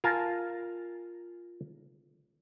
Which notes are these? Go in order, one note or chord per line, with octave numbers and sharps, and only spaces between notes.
F4 A#4 G#5 A5